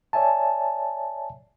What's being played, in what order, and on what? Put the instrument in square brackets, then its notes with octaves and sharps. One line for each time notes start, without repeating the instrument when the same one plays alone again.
[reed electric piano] C#5 D5 E5 G#5 A5